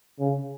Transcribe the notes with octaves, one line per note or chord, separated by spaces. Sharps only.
C#3